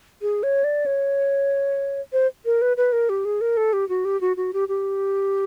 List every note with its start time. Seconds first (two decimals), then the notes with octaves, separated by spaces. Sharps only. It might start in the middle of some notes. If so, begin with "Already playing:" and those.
0.22 G#4
0.43 C#5
0.64 D5
0.86 C#5
2.13 C5
2.45 A#4
2.62 B4
2.77 B4
2.93 A#4
3.09 G4
3.25 G#4
3.41 A#4
3.57 A4
3.73 G4
3.89 F#4
4.05 G4
4.21 F#4
4.37 F#4
4.53 G4
4.69 G4